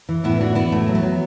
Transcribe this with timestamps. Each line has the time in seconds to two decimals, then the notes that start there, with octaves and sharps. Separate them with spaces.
0.09 E3
0.24 A2 B3 E4
0.40 E3 D4 F#4
0.55 E3 B3 E4
0.72 A2 A3
0.88 F#3
0.95 B3
1.02 F#3